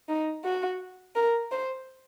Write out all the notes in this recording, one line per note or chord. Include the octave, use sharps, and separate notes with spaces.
D#4
F#4
A#4
C5